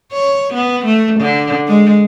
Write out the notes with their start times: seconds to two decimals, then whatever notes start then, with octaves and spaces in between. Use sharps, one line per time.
0.13 C#5
0.54 B3
0.86 A3
1.20 D3
1.68 G#3